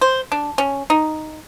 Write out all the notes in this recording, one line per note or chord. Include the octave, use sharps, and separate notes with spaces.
C5
D4
C#4
D#4